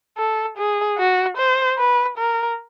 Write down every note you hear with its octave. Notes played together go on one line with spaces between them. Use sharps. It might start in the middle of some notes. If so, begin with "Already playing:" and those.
A4
G#4
F#4
C5
B4
A#4